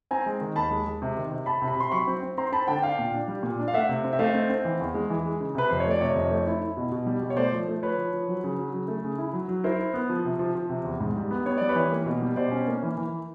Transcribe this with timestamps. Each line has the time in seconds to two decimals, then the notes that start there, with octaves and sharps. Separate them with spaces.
0.11 C4 G#5 A#5
0.26 G#3
0.41 D#3
0.56 D#2 A5 B5
0.70 G#3
0.87 G#3
1.02 C3
1.17 D#3
1.31 C3
1.46 C3 A5 B5
1.62 C3
1.68 B5
1.76 C3 C6
1.92 F#3 B5 C#6
2.07 C4
2.23 C4
2.38 C4 A#5 C6
2.52 C4 A5 B5
2.67 D3 G5 A5
2.82 D4 F5 G5
2.99 A#2
3.14 D4
3.28 G3
3.43 A#2
3.59 D4
3.68 F5
3.74 A3 E5 F#5
3.89 C3
4.04 C4
4.13 E5
4.19 A3 D#5 F5
4.34 C4
4.50 C4
4.65 E3
4.80 E2
4.94 G#3
5.10 E3
5.25 G#3
5.40 C#3
5.55 C3 B4
5.69 F2 C5
5.80 C#5
5.86 A3
5.91 D5
6.01 C3 C#5 D#5
6.16 F2
6.31 A3
6.47 E4
6.61 E4
6.77 B2
6.92 B2
7.06 G3
7.22 B2
7.30 C#5
7.37 A3 C5 D5
7.53 F3
7.68 A3
7.83 F3 B4 C#5
7.98 F3
8.13 F3
8.28 F#3
8.44 C#3
8.59 F#3
8.73 C#3
8.88 A3
9.04 C#3
9.18 E4
9.33 F#3
9.48 F#3
9.64 E4 A#4 C5
9.80 E4
9.94 B3
10.10 F3
10.25 C3
10.39 F3
10.55 F3
10.70 C3
10.85 E2
11.00 G#2
11.16 G3
11.31 B3
11.46 B3 C#5
11.58 G3 D5
11.69 B4 C#5
11.76 E3
11.92 A#3
12.06 B2
12.22 G3
12.36 B2 C5 D5
12.51 C#4
12.68 A#3
12.83 E3
12.97 E3